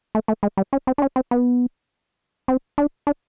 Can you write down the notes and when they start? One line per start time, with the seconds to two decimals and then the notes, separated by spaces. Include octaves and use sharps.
0.15 A3
0.28 A3
0.43 G#3
0.57 G3
0.73 C#4
0.87 C4
0.98 D4
1.02 C#4
1.16 C4
1.31 B3
2.48 C4
2.78 D4
3.07 D4